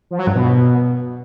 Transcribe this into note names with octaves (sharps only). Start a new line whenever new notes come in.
F3
F#3
G2
B2